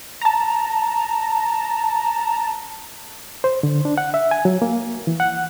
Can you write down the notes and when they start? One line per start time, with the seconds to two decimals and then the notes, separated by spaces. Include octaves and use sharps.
0.22 A5 A#5
3.44 C5
3.63 D3
3.85 D4
3.98 F#5
4.14 E5
4.31 G#5
4.45 F#3
4.62 A#3
5.07 E3
5.20 F#5